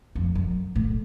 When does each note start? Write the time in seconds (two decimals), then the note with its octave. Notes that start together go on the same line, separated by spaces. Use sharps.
0.15 F2
0.35 F#2
0.75 A2